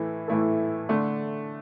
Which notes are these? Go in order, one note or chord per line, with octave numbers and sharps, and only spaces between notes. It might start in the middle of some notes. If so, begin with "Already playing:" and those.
Already playing: A2 E3 A3 E4
A2 E3 A3 E4 A4
D3 A3 D4